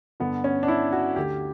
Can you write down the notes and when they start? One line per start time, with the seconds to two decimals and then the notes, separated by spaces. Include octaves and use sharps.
0.20 G2 D3 B3
0.44 C#4
0.63 D4
0.68 E4
0.92 F#4
1.16 D2 D3 G4